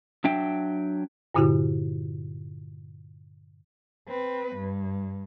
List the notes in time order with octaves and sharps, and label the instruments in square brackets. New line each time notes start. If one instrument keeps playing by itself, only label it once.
[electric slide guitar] F#3 D4 E5 G5
[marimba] G2 A#2 D3 E4 F#4 G4
[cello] C4 B4
G2